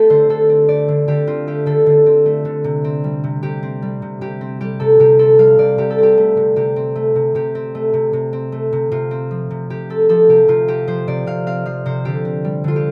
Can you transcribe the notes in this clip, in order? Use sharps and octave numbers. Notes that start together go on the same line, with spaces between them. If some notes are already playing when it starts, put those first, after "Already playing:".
Already playing: A3 C4 G4 A4
D3 C5
D3 A4
C4
A3 D5
D3
D3 G4
C4 F4
A3 G4
D3 A4
D3
C4
A3
D3
C3
C4
G3
C3
C3 G4
C4
G3
C3
C3 G4
C4
G3 G4
C3 A4
C3 G4
C4 A4
G3 F5
C3 D5
C3 G4
A4
C4 G4
A3
C3
C3 G4
C4
A3
C3
C3 G4
C4
A3
C3
C3
C4
A3
C3
C3 F4
C4
F3
C3
C3 G4
C4 A4
F3 A4
C3 G4
C3 F4
C4 G4
F3 C5
C3 D5
C3 F5
C4 F5
F3 F5
C3 C5
D3 G4
C4
G3
D3 F4
G4